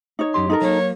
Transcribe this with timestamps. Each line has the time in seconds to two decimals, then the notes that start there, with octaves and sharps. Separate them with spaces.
0.19 D#4 C#5
0.34 F#2 G4 C6
0.50 D#4 A4 A#4
0.62 F#3 A3 A#3 C#5